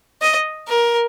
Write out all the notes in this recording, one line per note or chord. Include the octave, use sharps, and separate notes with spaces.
D#5
A#4